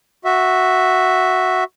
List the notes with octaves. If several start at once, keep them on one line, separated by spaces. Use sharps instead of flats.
F#4 E5